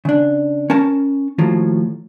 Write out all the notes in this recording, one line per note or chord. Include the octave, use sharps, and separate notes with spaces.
C#3 D4
C#4 A#4 A5
D#2 A2 F3 F#3